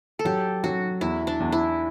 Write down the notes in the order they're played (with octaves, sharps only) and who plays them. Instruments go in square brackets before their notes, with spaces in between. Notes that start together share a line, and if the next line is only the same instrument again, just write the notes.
[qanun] A4
[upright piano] F#3 [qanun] G4
[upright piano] F#3 [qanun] F#4
[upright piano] E2 [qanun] E4
[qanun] D4
[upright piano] E2
[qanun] E4